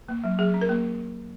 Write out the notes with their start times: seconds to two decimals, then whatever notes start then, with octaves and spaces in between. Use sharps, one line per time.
0.08 A#3
0.24 F#3
0.39 F#3 G#4
0.54 C#4
0.61 A#4
0.69 A#3